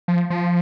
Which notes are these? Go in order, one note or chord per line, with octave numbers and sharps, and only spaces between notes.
F3
F3